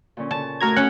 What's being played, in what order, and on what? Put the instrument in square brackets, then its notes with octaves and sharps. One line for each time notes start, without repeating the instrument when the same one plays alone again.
[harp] A#2 D3 C#4
[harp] C#3 C#4 [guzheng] A5
[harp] A3 F#4 D#6 [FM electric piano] A#4 A#5 G#6
[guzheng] C#4 [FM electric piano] F#5